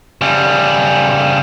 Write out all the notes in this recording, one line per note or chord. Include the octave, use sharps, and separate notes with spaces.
C#3 G3